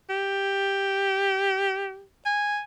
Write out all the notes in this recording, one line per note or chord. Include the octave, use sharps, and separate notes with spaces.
G4
G#5